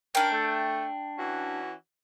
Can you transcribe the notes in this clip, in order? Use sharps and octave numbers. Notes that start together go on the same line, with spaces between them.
C#4 D4 A#4 G5
A3
E3 C#4 F#4